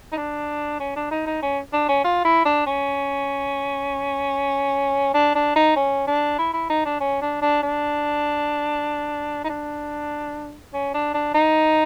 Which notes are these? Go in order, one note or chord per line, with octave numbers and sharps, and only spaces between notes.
D#4
D4
C#4
D4
D#4
D#4
C#4
D4
C#4
F4
E4
D4
C#4
D4
D4
D#4
C#4
D4
E4
E4
D#4
D4
C#4
D4
D4
D4
D#4
D4
C#4
D4
D4
D#4